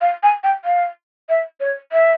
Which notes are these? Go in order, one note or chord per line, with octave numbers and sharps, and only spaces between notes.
F5
G#5
G5
F5
E5
C#5
E5